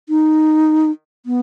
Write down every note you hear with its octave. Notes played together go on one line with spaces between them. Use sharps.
D#4
B3